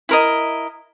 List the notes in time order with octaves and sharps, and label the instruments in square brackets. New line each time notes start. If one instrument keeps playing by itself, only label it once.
[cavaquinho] E4 A#4 D#5